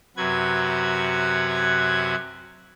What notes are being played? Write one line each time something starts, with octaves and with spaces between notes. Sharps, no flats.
F#2 C3 F#3 F#4 B4 G#6